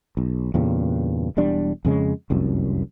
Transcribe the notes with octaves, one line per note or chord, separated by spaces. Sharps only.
B1
E2 G2 A#2 C#3
E1 E2 G3 D4
F2 C#3 G#3
F1 C2 F#2